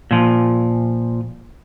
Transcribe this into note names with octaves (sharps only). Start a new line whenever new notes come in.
A#2 F3